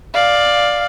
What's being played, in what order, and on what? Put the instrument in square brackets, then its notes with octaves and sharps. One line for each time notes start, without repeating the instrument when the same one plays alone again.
[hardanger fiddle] D5 [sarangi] F5